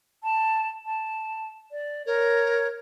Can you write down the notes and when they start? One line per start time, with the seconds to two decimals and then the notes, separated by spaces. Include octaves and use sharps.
0.23 A5
0.86 A5
1.71 D5
2.06 A#4 C#5